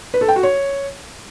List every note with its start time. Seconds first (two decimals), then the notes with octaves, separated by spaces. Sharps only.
0.14 B4
0.21 A4
0.28 G5
0.36 F#4
0.43 C#5